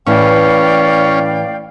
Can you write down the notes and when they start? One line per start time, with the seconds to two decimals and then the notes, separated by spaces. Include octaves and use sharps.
0.07 A2 E3 C#4 D5 F5 G5